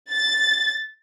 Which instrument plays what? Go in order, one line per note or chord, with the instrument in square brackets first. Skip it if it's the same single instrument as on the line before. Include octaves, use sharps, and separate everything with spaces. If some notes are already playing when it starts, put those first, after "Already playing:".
[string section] A6